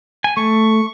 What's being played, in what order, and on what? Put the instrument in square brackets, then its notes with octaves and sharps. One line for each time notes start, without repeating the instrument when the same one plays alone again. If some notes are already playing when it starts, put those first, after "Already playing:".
[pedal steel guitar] G#5
[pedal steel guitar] A3 [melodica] C#6